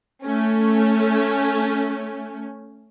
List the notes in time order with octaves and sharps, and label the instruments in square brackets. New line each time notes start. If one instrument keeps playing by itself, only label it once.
[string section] A3 C#4